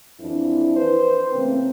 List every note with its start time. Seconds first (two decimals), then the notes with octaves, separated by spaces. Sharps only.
0.21 F2 E3 D4 E4
0.76 B4 C5
1.33 C#3 E3 A3 A#3 C4